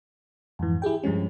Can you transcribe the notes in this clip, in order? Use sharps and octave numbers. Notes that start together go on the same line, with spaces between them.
F2 G#2 E3
E4 G4 G#4 G5
G2 F3 G3 G#3 C#4